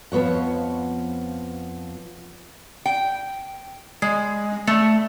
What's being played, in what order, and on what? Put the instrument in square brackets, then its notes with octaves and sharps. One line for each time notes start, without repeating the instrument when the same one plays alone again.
[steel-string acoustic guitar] F2 F3 B3 C#5 F#5
[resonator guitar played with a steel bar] G5
G#3
A3